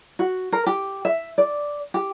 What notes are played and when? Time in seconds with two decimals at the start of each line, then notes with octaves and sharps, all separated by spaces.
0.19 F#4
0.52 A#4
0.66 G4
1.05 E5
1.38 D5
1.94 G4